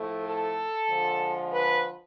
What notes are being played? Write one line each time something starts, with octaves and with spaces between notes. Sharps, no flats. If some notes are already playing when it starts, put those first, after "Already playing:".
Already playing: A2 F3 A3
A4
D3 F3 G#3
B4